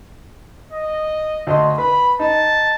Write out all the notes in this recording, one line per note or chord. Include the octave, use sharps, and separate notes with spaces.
D#5
D2 D#5 C6
B4 B5
D#4 A5